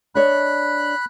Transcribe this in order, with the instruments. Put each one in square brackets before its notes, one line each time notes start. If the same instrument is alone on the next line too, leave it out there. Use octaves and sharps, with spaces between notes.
[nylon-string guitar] D4 C#5 D#5 [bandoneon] B5 F#6